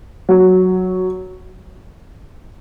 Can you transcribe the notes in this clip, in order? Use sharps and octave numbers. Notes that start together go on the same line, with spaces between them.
F#3